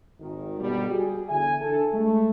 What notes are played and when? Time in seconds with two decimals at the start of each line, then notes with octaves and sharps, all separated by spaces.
0.20 G#1 D#3
0.60 G1 B2 G3
0.90 F#4 G#4
1.29 E2 D3 E5 G#5
1.61 D4 A4
1.93 G#3 A3